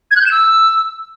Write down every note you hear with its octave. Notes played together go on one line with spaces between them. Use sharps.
G#6
F#6
G6
E7
E6